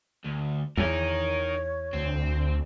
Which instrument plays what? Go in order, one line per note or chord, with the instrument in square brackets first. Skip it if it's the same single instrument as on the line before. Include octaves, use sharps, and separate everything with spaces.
[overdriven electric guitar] D2
[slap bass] E2 [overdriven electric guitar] D#4 A#4 [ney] C#5
[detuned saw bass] D2 [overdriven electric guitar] C4